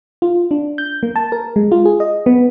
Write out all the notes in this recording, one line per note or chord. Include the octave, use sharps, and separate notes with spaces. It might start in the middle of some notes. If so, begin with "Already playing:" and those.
F4
D4
G6
A#3
A5
A#4
G#3
F4
G#4
D#5
B3